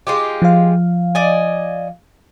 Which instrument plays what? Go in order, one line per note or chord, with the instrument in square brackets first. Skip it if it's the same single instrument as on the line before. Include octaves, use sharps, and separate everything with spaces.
[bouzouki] G#3 F4 G4
[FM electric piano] F3 F5
[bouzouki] D5 D#5 G#5